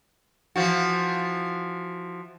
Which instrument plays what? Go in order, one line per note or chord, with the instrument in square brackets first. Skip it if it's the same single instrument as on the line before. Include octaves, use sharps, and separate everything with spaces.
[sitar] E3 F3 F#4